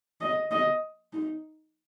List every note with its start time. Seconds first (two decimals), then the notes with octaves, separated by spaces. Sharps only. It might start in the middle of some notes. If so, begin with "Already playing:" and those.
0.21 D#5
0.51 D#5
1.13 D#4